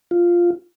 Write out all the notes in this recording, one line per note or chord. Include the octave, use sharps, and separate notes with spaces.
F4